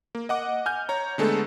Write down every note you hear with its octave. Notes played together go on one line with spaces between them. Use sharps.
A#3
D#5 F#5 D6
G#5 F6 G6
C#5 A#5
D3 G#3 A3 B3 A4